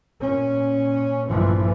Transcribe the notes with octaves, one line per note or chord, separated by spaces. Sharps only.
A#2 C#4
A#1 G2 E3 F3 A3